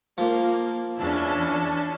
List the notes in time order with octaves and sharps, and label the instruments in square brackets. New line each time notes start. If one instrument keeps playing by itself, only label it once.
[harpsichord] F3 [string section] A#3
[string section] E2 E3 [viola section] C#4 E4 A5 [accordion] D4